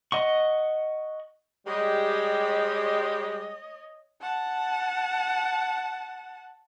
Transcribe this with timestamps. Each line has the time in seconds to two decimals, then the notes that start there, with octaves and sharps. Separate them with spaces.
0.12 D#5 F#5 C#6
1.66 G3 G#3 G4 C#5 D#5
4.21 F#5 A5